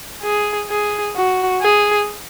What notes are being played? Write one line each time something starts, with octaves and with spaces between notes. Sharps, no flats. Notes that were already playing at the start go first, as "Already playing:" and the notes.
G#4
G#4
F#4
G#4